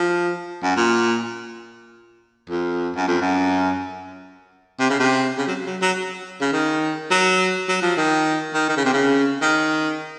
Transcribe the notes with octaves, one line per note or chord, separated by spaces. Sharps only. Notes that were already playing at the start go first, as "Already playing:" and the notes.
Already playing: F3
F#2
A#2
F2
F#2
F2
F#2
C3
C#3
C3
C#3
F#3
F#3
F#3
C#3
D#3
F#3
F#3
F3
D#3
D#3
D#3
C#3
C3
C#3
D#3